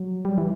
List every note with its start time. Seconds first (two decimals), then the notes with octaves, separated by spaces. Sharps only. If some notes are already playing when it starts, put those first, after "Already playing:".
Already playing: F#3
0.25 G3
0.38 E3